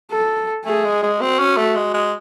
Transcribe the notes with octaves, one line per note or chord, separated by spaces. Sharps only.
A4
A3 G#4
G#3
G#3
C4 F#4
C#4
A3
G#3
G#3